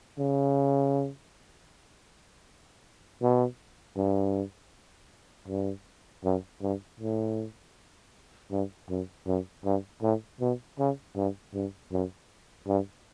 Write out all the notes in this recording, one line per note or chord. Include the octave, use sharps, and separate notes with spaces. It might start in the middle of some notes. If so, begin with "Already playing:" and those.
C#3
B2
G2
G2
F#2
G2
A2
G2
F#2
F#2
G2
A2
B2
C#3
G2
G2
F#2
G2